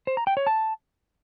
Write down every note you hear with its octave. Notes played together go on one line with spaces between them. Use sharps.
C5
A#5
G5
C#5
A5